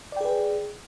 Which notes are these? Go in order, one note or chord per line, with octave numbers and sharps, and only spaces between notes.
G#4 B4 D5 G5